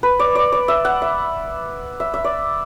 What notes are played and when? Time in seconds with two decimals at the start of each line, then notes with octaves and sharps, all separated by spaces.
0.03 B4
0.19 D5
0.35 D5
0.52 D5
0.68 E5
0.85 F#5
1.02 E5
2.00 E5
2.14 E5
2.24 D5